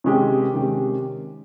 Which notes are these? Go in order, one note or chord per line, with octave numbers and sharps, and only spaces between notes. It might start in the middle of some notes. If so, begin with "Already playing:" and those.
C3 D#3 G#3 C#4 G4
C3 D#3 G#3 C#4 G4